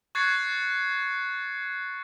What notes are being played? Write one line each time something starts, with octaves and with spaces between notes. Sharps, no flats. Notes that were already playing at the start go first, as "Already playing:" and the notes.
C#6 F#6 G#6 A6 C7 C#7